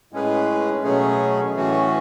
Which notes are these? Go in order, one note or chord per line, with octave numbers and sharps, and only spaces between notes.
A2 G#3 C#4 G#4 B4
B2 F#3 A3 C#4 G#4
A2 E3 A3 C#4 F#4